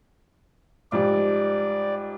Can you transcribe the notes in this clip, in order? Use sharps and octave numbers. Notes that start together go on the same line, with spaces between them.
G#2 F3 G3 D5